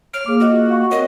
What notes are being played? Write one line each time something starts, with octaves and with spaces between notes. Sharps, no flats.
C#5 F6 D7
A#3 G#4 D6
F4 F#4 D#5
F5 F#5 C#6
C4 A#4 C#5 D#5